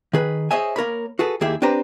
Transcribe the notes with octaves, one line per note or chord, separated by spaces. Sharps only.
D#3 G#4 B4
G#4 C5 C#5 D#5 E5 G#5
A#3 A#4 C#5 B5
F#4 G#4 A4 B4
D#2 A#3 E4 G4 G#4 E5
C4 D4 G4 B4 C5 A#5